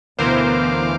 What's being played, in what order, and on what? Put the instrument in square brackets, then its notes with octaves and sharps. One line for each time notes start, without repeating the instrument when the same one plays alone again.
[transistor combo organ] D2 F5 D6 [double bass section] B2 B3 [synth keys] E3 A#4 C5